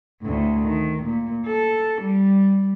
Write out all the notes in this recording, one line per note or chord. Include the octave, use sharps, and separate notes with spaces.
D2 A2
D#3
A#2
A4
G3